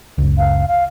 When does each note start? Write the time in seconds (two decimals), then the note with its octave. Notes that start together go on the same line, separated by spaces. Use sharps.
0.18 F#1 C#2
0.38 F5
0.68 F5